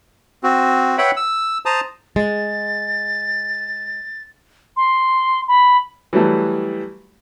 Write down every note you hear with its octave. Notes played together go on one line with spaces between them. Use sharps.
C4 F#4
B4 C#5 E5 F#5 G5 B5
E6
C5 A5 A#5 D#6
G#3 A6
C6
B5
E3 F#3 G3 A3